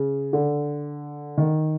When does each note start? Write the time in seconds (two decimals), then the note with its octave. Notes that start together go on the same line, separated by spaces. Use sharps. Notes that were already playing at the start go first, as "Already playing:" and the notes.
Already playing: C#3
0.33 D3
1.38 D#3